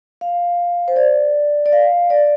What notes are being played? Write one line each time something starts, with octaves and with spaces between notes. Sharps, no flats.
F5
C5
D5
D5
F5
D5